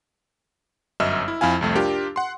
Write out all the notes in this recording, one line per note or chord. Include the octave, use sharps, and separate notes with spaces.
G1 F#2 D#5 E5 E6 F6
E4
F2 E4 F5 G#5
C2 F2 A3
D4 F4 G4 A#4
F#5 C6